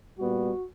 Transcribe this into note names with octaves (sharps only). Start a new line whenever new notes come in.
A#2 G3 B3 F#4